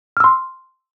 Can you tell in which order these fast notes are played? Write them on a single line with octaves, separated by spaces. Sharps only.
F6 E6 C6